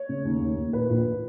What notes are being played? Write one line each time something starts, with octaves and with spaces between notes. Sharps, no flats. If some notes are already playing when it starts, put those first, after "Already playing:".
Already playing: C#5
C#3
D#2
D#2
D#2
A#2 B4
A#1